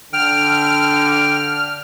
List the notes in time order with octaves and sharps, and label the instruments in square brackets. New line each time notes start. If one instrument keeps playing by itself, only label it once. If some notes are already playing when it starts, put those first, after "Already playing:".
[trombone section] D3 [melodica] G5 [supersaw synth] F6